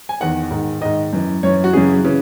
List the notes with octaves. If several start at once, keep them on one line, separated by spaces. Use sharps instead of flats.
G#5
E2 D#3 F#5
G#2 D#3
G#2 D#3 D#5
F#2 E3
F#2 E3 C#5
F#4
F#2 C#3 E3 G#4
C#3 E3